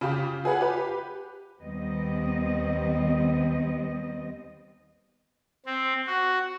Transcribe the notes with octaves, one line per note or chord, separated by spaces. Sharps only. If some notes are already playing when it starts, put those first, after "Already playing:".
C#3 F4 G4
F4 G#4 B4 F#5
G4 B4
D#2 G3 B3 C4 D#5
C4
F#4